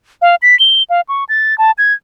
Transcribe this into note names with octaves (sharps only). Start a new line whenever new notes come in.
F5
B6
G7
F5
C#6
A6
A5
G#6